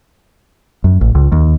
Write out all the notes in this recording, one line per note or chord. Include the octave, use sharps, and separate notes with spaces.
F#2
A1
C#2
D#2